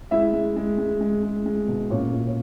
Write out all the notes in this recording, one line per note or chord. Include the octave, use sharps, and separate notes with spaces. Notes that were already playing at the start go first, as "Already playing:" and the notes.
G#3 E4 E5
G#3
G#3
G#3
G#3
G#3
G#3
B2
A#2 C#4 C#5
A#2
C#5